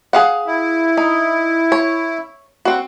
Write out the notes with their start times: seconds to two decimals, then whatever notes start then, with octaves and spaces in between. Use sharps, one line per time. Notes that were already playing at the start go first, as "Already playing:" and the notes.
0.13 G#4 F5 F#5
0.46 E4
0.97 D#4
1.72 C#5
2.65 C4 F#4